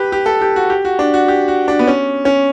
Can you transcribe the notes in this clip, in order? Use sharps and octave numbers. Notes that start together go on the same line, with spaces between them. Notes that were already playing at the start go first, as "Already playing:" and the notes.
Already playing: G4 B4
G4
A4
G4
F#4
G4
F#4
D4
F#4
G4
F#4
D4
B3
C#4
C#4